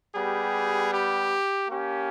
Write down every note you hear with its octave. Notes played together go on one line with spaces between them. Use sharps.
G3 B3 G4 G#4
G4
A#3 C#4 G4